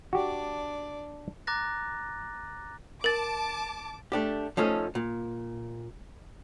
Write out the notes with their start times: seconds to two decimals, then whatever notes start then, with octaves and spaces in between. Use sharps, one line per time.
0.13 D4 F#4 G4 D5
1.47 A#5 D6 F#6 A6 A#6
3.04 A#4 A5 D6 A6
4.12 A3 D4 G4
4.57 F3 A3 C#4 D#4 A4
4.95 A#2